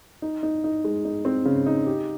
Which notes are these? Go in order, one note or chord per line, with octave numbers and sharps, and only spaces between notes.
D#4
D#4
D#4
G#3
D#4
C4
C#3
D#4
G4